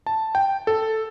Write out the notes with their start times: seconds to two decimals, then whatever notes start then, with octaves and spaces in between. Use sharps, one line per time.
0.06 A5
0.35 G5
0.67 A4